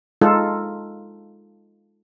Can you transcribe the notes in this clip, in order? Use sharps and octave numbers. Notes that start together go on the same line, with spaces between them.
G#3 D#4 F4 A4